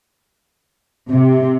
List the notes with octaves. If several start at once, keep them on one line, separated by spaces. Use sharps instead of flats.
C3